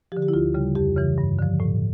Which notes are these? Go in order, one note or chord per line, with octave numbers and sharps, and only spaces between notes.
D3 F3 G4
G4
E4
D2 F4
C#3 G3
F2 G4
C#3 E3
G2
D3 F3
A2